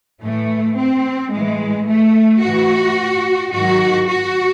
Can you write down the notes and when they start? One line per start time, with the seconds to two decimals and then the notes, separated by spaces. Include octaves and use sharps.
0.22 A2 E3 A3
0.77 C4
1.32 A2 E3 G#3
1.88 A3
2.42 A2 E3 F#4
3.53 G#2 D#3 F#3 F#4
4.08 F#4